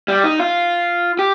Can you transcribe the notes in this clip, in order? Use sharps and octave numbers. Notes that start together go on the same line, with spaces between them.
G3
D#4
F4
G4